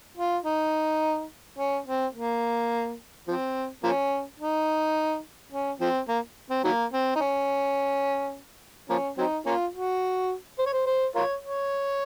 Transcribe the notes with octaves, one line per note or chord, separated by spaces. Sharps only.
F4
D#4
C#4
C4
A#3
F3 C4
F3 A#3 C#4
D#4
C#4
F3 C4
A#3
C4
D#3 F#3 A#3
C4
D#4
C#4
F3 A#3 C#4
F#3 C4 D#4
A#3 C#4 F4
F#4
C5
C#5
C5
C5
F4 A#4 C#5
C#5